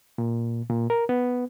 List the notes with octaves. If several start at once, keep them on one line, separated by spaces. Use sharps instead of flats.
A#2
A#2
A#4
B3